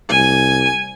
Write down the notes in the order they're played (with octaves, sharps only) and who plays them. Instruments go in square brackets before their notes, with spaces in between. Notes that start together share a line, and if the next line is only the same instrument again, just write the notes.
[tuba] C2 [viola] G#5